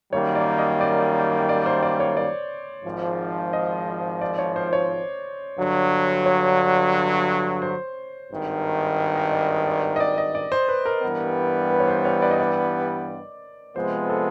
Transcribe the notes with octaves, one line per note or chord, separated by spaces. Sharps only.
F#2 D#3 G3 A#3 C#5
D5
D#5
D5
D5
C5
D5
C#5
D5
G#1 G#2 F3
D#5
D5
C#5
C5
C#5
G2 D3 F#3
C#5
C5
G#1 G2 D#3
D#5
D5
D5
D#5
D5
D#5
D5
C5
B4
A#4
G2 E3 G3 B3
B4
C#5
C5
C#5
D5
D#5
D5
C3 F3 G#3 B3 C5
A4